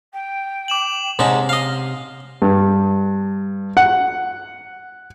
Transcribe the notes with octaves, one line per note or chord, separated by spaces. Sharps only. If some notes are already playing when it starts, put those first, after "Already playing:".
G5
D6 E7 F#7
G#2 C3 G#3 C#4 A5
D#5 F5
G2
F#5